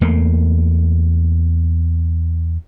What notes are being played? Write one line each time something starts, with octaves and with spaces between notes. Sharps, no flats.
E2 A3 A#3